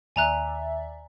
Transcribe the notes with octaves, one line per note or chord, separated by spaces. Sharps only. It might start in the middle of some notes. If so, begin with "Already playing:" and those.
D#2 D5 E5 G#5 A#5 F#6